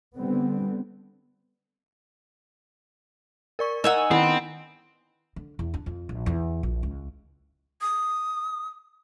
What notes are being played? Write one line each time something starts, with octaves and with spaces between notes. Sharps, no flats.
D3 G3 B3 C4
A#4 D5 C#6
D#4 A#4 F#5 G#5 E6
D#3 B3 C4 E4
D3
E2
D4
F2
A#1
E2
A#1
C#2
D#6